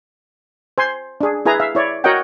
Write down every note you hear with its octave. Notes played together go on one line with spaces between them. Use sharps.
C5 G#5 C6
D4 G#4
E4 G#4 B4 G#5 A#5
E5 F5
E4 C#5 D5
F#4 A#4 C#5 D#5 F#5 G5